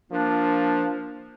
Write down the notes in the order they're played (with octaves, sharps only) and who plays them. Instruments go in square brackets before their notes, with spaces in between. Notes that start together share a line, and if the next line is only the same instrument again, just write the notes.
[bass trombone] F3 [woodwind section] A#3 D4